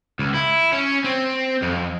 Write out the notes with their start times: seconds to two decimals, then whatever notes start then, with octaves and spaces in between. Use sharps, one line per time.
0.19 C#2
0.35 E4
0.73 C#4
1.04 C4
1.62 F2